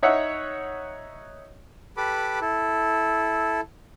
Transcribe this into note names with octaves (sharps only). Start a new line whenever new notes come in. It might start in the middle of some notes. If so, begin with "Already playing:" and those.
D#4 C#5 E5 F#5
G4 A4 B4 B5 D6
E4 A4